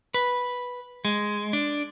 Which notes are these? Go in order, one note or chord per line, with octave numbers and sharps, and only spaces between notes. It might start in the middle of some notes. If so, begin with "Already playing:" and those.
B4
G#3
D4